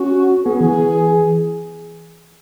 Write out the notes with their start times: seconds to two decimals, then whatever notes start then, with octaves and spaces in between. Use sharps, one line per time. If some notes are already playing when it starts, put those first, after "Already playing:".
Already playing: C#4 F#4
0.45 B3 G#4
0.61 E3